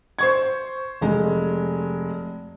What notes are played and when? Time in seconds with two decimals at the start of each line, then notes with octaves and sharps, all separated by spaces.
0.19 C5 C#6 G#6
1.01 F1 G#3